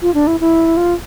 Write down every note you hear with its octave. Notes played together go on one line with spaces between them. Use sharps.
F4
D4
E4
E4
F4